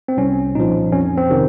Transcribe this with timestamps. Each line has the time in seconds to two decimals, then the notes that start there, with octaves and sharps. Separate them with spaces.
0.08 C4
0.17 C2 C#4
0.55 A#2 F3 D#4
0.92 F2 C#4
1.17 C4
1.30 C3 D#3